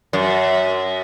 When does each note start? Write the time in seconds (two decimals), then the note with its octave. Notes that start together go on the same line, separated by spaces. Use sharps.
0.13 F#2